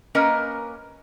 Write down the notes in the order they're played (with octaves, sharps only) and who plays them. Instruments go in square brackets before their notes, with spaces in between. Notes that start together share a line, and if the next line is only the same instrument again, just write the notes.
[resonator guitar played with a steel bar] A#3 C#4 A#4 B4 D#5